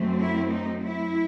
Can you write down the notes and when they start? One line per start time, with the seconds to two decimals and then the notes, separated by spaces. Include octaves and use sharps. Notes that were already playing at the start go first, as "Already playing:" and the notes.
Already playing: F#2 F#3 A3 C4
0.19 E4
0.51 D#4
0.82 E4